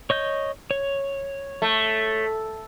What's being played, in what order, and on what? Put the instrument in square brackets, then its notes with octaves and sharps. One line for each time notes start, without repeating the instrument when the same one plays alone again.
[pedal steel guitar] C#5 D#5 G6
C#5
[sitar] A3